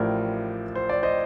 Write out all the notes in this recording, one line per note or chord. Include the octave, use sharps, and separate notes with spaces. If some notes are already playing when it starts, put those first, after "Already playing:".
Already playing: A1 A2 F3 A#4 D5
C5
D5
C5 D#5